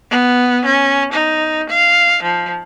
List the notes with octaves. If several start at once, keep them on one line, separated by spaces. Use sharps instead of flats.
B3
C#4
D#4
F5
F3